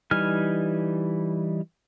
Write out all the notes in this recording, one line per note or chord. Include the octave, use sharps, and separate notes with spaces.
E3 G3 D#4 G#5 F6